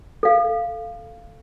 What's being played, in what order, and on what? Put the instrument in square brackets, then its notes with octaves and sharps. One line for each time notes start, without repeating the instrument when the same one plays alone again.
[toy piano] A4 F5